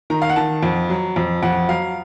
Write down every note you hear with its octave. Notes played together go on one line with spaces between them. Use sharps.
D#3 A#5
F5
F#5
D#3 A5
F2
F#3
F2
F2 F#5
F#3 F5